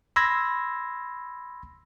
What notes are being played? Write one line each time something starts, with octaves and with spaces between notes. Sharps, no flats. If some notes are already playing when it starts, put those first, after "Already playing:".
B5 C6 E6 G#6 A#6